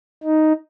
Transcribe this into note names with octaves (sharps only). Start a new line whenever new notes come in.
D#4